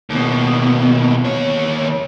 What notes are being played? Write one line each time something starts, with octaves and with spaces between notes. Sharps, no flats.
D#2 B2
D#2 C#5